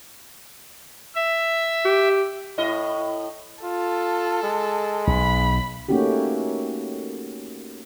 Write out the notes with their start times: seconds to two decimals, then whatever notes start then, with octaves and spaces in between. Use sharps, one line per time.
1.15 E5
1.85 G4
2.58 A2 E4 D#5
3.64 F4 A4
4.43 G#3
5.07 B1 B5
5.88 A3 A#3 C#4 D#4 F#4 G4